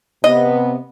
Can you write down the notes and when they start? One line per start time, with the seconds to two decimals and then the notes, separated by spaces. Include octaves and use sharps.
0.24 C3 B3 D#5